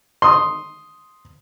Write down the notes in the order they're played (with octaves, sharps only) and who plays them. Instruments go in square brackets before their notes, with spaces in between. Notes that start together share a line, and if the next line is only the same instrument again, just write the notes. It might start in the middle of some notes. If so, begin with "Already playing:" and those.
[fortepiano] C6 D#6